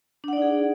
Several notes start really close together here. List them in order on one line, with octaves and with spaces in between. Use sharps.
D4 F#5 D5 D#4 G#4